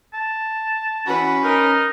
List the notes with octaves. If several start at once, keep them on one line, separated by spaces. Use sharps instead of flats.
A5
E3 C#4 F#4 B4
D#4 A#4